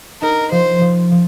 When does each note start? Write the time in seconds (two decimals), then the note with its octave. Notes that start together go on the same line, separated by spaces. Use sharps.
0.21 D#4 A#4
0.52 F3 C5
0.81 F3
1.11 F3